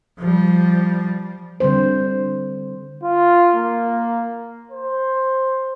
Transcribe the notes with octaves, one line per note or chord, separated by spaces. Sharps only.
F3 G3
D3 G3 C4 C5
F4
A#3
C5